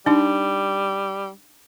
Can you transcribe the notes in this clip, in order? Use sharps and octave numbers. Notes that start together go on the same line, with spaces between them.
G3 D4 D#4